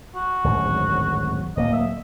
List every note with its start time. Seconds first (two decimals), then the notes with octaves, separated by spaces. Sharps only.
0.16 F#4
0.44 D1 G#1 F#2
1.57 D1 A#3 D#5
1.73 E5